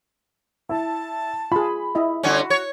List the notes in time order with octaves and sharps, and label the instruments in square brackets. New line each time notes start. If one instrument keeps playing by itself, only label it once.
[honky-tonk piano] E4 [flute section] A5
[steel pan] F4 G#4 [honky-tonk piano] B5
[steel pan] E4 D#5 E5
[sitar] G2 D3 C#4 [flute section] F#4
[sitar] C#5